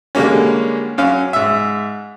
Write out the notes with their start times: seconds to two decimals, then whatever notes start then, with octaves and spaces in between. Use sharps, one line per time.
0.15 D3 G3 G#3 A#3 C#4
0.98 F#2 C#4 F5
1.33 G#2 E5